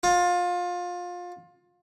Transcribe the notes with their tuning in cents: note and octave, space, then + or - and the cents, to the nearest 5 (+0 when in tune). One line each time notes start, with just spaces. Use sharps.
F4 +25